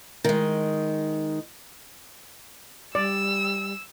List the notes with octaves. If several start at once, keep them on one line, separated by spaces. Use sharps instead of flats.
D#3 G#3
G3 D5 E6